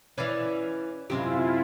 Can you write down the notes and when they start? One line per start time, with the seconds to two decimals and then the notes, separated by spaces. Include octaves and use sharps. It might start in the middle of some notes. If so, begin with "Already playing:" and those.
0.18 E3 C#4 B4 D5 F5
1.10 F#2 C3 G#3 E4 F4 G4